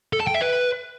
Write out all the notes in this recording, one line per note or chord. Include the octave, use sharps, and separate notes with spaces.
A4
A5
G5
E5
B4